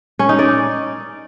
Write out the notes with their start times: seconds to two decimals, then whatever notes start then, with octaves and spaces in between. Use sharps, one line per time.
0.19 C#4
0.29 D#4
0.39 D5